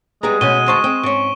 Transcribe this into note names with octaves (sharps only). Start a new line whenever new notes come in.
G3 G#3 B3 G#4 A#5
B2 A3 B3 C#4 D#7 G7
D2 C5 A5 C#6 D#7 G7
C4 G5
G#2 C#4 D7